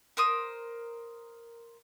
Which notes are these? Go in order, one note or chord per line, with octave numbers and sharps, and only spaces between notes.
A#4 C5 D#6